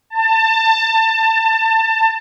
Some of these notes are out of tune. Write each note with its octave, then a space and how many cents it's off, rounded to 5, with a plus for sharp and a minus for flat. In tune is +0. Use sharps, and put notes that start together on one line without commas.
A5 +25